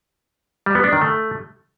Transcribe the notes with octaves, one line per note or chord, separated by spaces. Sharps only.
G3
B3
D4
D#3
A3